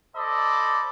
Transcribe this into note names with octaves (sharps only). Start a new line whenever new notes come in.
A4 C5 D5 D#5 B5